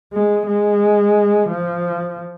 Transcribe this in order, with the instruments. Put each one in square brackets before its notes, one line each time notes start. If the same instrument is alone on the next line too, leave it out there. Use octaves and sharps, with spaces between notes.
[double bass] G#3
G#3
F3